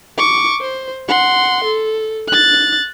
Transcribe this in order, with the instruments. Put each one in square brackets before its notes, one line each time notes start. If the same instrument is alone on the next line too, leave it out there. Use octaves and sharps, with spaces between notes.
[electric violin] C#6 D6
C5
F#5 C6
A4
F#6 A6